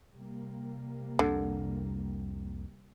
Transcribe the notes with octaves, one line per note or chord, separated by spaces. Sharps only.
C3 G3 A#3
C2 F2 D3